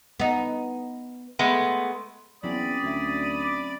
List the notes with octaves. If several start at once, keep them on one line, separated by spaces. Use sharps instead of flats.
B3 D#4
G#3 A3 B3
E2 F#3 C4 C#4 D5 B5 D#6
D2 E5 G#6
D6